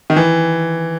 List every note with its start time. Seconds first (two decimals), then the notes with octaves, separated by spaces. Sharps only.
0.10 D#3
0.16 E3